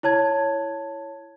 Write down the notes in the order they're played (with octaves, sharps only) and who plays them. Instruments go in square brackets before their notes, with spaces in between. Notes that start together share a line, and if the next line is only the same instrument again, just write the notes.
[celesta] E4 C#5 A5 G#6